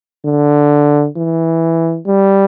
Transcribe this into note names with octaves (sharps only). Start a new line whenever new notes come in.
D3
E3
G3